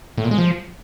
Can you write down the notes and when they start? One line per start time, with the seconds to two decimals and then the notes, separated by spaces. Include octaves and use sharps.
0.18 A2
0.24 A#2
0.31 G#3
0.38 F3